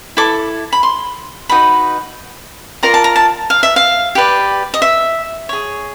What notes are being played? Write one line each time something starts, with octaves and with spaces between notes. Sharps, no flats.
E4 A4 D6
B5
C6
D#4 F#4 B4 D#5 B5
F4 A#4 D5 A#5
A5
A#5
A5
F5
E5
F5
G4 B4 D5
D#5
E5
G#4 C#5